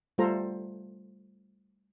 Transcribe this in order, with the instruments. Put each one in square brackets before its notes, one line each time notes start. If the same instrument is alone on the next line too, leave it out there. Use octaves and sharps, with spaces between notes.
[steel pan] G3 A3 F4 A4 C5 A#5